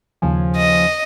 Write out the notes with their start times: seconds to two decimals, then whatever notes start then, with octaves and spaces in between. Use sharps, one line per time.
0.22 D#2 C#3 F3 G#5
0.56 D#5